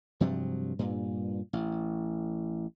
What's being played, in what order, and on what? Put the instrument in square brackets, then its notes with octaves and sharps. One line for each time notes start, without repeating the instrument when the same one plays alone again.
[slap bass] G2 C3 F3 F#3
G2 A#2
A1